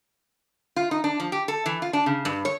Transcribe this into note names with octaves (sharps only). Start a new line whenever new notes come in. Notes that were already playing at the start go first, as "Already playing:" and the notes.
F4
D#4
D4
F3
G4
A4
E3
F4
D4
C#3
G2
C#5